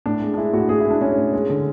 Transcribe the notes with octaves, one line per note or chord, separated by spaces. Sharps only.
A2 D4
G#3
D4
G#3 E4
A2 F#4
A2 G#4
E4
G#3
D4
G#3 C#4
A2
G#3
D3